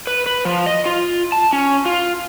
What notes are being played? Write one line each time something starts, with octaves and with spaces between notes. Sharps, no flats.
B4
B4
F3
D#5
F4
A5
C#4
F4